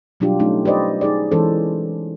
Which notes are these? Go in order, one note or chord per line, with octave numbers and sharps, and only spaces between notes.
B2 F#3 G3 D4 F4 G4
F#3 A3 C#4 D#4
G4 B4 C5 D5 D#5
D#4 G#4 D5
E3 G#3 C#4 A4 C5